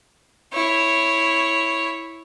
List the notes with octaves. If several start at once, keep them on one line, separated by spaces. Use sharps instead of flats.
E4 C#5